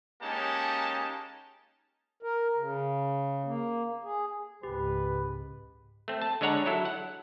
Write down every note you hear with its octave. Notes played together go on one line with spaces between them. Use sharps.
G#3 A#3 C#4 D#4 G4 A5
A#4
C#3
A#3
G#4
C#2 G#2 G4 B4
A3 C4
A5
D3 G#3 D4 C#5 F#5 A#5
F#3 E4 A4
F#5